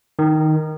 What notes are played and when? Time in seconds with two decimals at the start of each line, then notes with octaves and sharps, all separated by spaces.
0.19 D#3